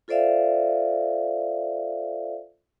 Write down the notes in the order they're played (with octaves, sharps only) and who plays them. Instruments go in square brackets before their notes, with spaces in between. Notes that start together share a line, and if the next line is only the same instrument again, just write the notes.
[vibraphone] F4 A4 C5 D5 E5 F5